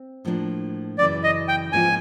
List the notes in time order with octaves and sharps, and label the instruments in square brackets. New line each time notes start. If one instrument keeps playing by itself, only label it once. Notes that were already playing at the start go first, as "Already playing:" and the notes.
Already playing: [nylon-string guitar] C4
A2 F3 A#3 D4
[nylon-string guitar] F#2 C#3 E3 [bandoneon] D5
[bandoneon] D#5
G5
[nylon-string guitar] G#2 F3 A#3 C#4 F4 [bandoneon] G#5